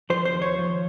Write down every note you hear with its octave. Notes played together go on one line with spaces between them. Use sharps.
F3 C5
C5
D#2
C#5
F3